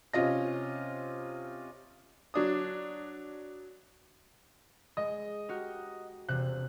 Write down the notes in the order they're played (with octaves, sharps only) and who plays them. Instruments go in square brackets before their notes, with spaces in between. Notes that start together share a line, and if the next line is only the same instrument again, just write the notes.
[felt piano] C3 C#4 F4 D#5 A#6
[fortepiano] F#3 D4 D#6
[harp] G#3 [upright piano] D#5
[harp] F#4 G4 A#4
[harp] E1 C3 [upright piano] F#6